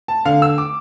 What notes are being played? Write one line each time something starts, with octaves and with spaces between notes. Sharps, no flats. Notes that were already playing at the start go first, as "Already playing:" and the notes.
A5
D3 F5
E6
D6